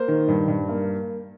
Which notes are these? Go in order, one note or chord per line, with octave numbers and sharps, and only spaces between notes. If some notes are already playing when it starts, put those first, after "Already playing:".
Already playing: A#3 C5
D#3
G2
G2
A#3